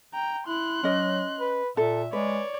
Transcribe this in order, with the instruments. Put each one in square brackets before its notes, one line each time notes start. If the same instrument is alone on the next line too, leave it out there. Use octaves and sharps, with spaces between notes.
[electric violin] G5 A#5
[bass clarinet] E4 [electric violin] C6 F#6
[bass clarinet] F#3 [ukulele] C#4 D#5
[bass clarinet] B4
[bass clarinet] A#2 [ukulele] A4 [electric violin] E5
[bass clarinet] G#3 [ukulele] B4 [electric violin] C#5 D5